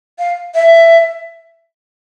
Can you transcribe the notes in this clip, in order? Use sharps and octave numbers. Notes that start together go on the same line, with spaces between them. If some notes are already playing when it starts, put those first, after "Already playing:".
F5
E5